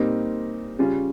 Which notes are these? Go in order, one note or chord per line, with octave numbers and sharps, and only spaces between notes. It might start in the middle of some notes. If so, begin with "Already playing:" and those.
Already playing: A#2 G3 C4 D#4 A#4
C#3 G3 C#4 F4